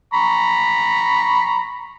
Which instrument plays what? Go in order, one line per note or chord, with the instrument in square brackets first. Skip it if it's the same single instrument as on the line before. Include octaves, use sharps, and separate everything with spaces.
[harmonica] A#5 B5 C#6